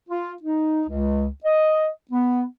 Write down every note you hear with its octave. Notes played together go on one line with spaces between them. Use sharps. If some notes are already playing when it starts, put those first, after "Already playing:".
F4
D#4
C#2
D#5
B3